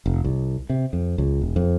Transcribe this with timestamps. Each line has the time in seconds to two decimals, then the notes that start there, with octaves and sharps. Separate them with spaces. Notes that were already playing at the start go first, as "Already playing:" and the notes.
0.06 F1
0.24 C2
0.70 C3
0.93 F2
1.18 C#2
1.42 E1
1.56 F2